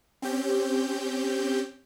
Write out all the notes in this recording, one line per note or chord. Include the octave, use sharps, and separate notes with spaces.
C4 C#4 G4 G6